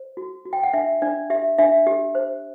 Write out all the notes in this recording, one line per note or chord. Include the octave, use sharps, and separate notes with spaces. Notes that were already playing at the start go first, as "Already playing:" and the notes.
Already playing: C5
F#4
F#4
G5
F#5
D4 E5
D4 D5
G4 E5
D4 E5
G4
C5